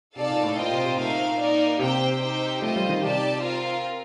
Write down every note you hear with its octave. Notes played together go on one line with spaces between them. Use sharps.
C3 D#4 A4 D5 F5 A5
A#2
A2
A#2 F4 C5 D#5 G5
C3
C3
A#2 A3 C4 D#4 A#4 F5
A#3 D#4 A#4 D5
C3 G4 C5 G5
D#4 G4 C5 G5
A3 F4 C5 D#5
G3
D#3
C3 D#4 G4 D5 A5
C4 F4 A#4 F5